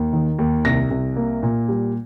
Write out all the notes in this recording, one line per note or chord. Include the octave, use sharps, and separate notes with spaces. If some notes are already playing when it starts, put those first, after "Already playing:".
Already playing: D#2
D#3
D#2
C2 A#6
C2
A#3
A#2
G3